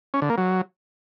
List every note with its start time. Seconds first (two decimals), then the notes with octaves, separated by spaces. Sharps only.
0.14 C#4
0.22 D3
0.30 A#3
0.38 F#3